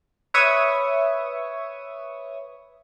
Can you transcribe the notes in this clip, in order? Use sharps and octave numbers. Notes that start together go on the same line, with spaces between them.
B4 C#5 E5 C#6 D#6